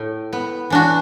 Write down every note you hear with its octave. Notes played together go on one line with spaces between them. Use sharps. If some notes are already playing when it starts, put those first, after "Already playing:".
Already playing: A2 A3
B3
E3 D4 F#4